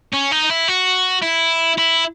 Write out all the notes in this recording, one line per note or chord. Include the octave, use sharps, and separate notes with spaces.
C#4
D#4
E4
F#4
E4
E4